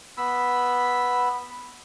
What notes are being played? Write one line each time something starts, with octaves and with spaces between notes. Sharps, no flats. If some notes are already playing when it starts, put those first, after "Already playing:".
B3 B5 E6